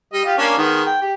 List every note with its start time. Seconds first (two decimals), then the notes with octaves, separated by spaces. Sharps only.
0.13 G3 D#5
0.25 F4 G4
0.38 A#3 C#4 D4
0.57 D#3 G#3 B3
0.86 G5
1.01 G4